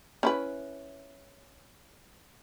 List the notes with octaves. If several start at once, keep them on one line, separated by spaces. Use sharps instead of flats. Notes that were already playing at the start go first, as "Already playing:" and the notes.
C#4 E4 B4